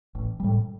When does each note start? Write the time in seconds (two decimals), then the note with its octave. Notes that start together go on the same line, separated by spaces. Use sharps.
0.15 A1
0.40 A2 G3